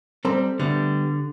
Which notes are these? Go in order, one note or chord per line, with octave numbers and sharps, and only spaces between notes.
G3 C4 A4 A#5
D3 G3 A3 B3